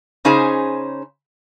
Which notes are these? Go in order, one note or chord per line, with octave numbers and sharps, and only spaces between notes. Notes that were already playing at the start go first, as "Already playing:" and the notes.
C#3 C#4 D#4 G#4 C5